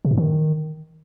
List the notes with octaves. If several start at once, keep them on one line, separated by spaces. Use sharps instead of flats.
C3
G#2
D#3